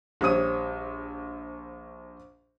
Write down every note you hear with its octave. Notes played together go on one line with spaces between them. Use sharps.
A#1 G3 C5 C#5 D#6 D#7